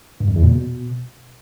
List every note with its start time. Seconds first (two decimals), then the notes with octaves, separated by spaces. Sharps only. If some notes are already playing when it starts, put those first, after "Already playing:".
0.20 G2
0.28 F2
0.36 E2
0.44 A#2
0.51 B2